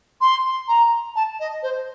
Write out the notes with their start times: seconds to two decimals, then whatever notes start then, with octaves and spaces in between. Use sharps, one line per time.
0.21 C6
0.68 A#5
1.16 A5
1.40 D#5
1.63 C5